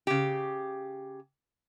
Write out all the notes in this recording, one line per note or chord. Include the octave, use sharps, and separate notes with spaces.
C#3 G4